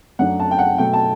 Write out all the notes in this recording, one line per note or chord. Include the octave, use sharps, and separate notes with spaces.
F#2 F#3 A3 D4 F#5
A5
G5
F#5
B2 F#3 A3 G5
A5